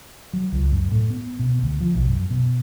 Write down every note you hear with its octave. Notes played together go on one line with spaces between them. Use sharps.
F#3
C#2
F#2
A2
B3
B2
D2
F3
B1
F#2
B2